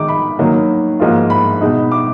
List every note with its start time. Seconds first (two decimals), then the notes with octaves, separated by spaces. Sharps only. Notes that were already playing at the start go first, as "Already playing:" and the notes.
Already playing: D#3 G#3 D#4 D6
0.09 B5
0.39 D#3 F#3 A#3 D#4
1.00 G#2 F3 A#3 F4
1.30 B5
1.61 B2 G#3 D#4
1.92 D6